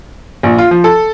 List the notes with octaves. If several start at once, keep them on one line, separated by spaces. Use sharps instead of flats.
A#1
F4
F3
A4